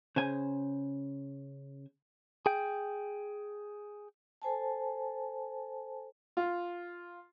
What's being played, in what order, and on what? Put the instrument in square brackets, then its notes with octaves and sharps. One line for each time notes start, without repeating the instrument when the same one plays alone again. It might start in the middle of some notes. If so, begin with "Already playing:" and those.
[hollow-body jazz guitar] C#3 C5 G#5
[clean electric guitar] G#4 G5
[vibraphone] A4 C5 G#5 A5
[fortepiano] F4